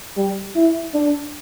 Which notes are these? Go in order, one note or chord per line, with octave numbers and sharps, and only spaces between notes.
G3
E4
D4